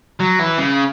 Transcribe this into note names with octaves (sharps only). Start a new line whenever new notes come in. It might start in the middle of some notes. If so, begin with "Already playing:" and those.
F#3
E3
C#3